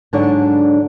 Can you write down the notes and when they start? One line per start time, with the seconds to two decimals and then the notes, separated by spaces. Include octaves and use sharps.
0.13 G#2 D3 F#3 D4 D#4 C#5